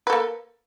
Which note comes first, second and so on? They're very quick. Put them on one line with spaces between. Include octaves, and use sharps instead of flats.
B4 A4 A#3